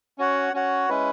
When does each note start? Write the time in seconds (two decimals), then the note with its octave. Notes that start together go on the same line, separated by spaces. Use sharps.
0.18 C#4 F#4 C#5 F#5
0.53 C#4 F#4 C#5 F#5
0.89 G#3 C#4 E4 B4